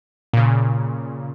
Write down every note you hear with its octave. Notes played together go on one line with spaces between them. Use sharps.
A#2 C#3